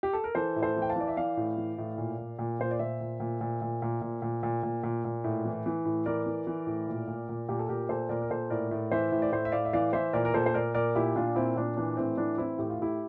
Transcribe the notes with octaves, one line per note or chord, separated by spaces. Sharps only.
G4
A4
A#4
E3 A4 C5
A2
A4 C5
E3
G5
F5 A5
E3 D5
E5
E3 D5 F5
A2
E3
A2
A#2
A#2
A#2
A#2 C5
D5
A#2 C5 E5
A#2
A#2
A#2
A#2
A#2
A#2
A#2
A#2
A#2
A#2
A#2
A2
E3
E3
A2
E3 A#4 D5
E3
E3
A2
A#2
A#2
A#2
A#2 G4
A4
A#2 G4 A#4
A#2 A4 C5
A#2 A#4 D5
A#4
A#2 A4 C5
A2 A#4 D5
A2
E3 C5 E5
A2
D5
A2 C5 E5
E5
A2 D5 F5
E5
E3 D5 F5
E3 C5 E5
A#2 A#4 D5
A#4
A#2 A4 C5
C5
A#2 A#4 D5
A#2 A#4 D5
A#2 E4 G4
A#2 D4 F4
A#2 C4 E4
A#2 D4
E3 D4
A2 C4
E3 D4
E3 C4 E4
A2 G4
F4
A2 E4 G4